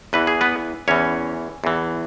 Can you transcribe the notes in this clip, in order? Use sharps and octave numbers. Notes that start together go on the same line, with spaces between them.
E2 E3 B4
G#4
B3 B4
E2 E3 C#4 C#5
E2 E3